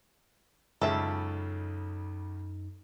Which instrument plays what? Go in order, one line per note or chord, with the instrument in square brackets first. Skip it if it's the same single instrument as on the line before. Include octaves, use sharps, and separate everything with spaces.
[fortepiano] C#2 C#3 [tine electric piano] F#2 D#4 [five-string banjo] A4 E5